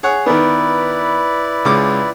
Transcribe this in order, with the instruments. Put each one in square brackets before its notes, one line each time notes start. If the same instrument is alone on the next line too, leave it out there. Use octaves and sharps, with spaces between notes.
[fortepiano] G#4 C#5 F#5
[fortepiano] D#3 B3 [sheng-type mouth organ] E4 B4 D5
[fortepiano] C#2 G#3 D6